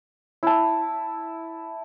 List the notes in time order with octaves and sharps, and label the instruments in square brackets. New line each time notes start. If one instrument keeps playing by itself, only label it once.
[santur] E4 A5